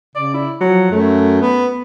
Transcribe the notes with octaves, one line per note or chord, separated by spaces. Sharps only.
C#3 D5
E4
F3 F#3
F#2 A3
B3